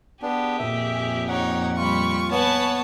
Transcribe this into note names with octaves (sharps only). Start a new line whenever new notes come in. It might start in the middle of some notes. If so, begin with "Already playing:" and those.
B3 D4 G4 G#4
F2 A#2 E5
D#4 C#5 F#5
G3 F4 G4 B5 C#6
B3 B4 C#5 F#5 G#5 A5